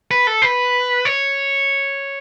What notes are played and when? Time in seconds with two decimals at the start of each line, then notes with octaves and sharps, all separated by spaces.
0.11 B4
0.27 A4
0.42 B4
1.05 C#5